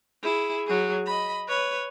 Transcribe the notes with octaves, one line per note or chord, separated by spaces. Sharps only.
E4 G#4
F#3 G#4
D#5 B5
B4 C#5